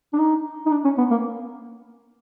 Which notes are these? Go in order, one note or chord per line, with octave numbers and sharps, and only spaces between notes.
D4
D#4
D#4
D4
C#4
B3
A#3